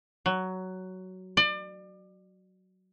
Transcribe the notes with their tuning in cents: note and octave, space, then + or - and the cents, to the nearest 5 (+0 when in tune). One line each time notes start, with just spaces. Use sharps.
F#3 +10
D5 +30